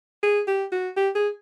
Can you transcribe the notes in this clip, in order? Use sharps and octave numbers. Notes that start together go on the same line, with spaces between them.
G#4
G4
F#4
G4
G#4